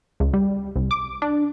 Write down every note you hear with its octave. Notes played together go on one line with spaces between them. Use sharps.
C#2
G3
C2
D6
D4